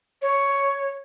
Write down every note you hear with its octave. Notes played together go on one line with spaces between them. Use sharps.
C#5